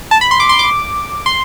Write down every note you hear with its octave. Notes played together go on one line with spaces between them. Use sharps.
A5
B5
C6
D6
C6
D6
C6